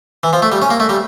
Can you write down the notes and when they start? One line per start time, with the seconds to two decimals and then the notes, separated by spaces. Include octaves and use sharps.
0.23 E3
0.33 F3
0.42 A3
0.52 G3
0.62 C#4
0.70 A#3
0.80 A3
0.89 G3